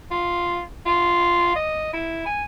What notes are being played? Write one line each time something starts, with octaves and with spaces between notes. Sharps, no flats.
F4
F4
D#5
E4
G#5